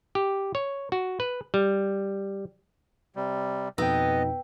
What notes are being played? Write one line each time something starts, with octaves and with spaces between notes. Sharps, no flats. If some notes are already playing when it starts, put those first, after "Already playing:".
G4
C#5
F#4
B4
G3
C3 G3
F2 B2 B3 D#4 D#5 G5 E6